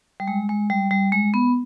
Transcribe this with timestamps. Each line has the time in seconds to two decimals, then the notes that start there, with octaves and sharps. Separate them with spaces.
0.20 G3
0.28 G#3
0.49 G#3
0.70 G3
0.91 G3
1.12 G#3
1.34 B3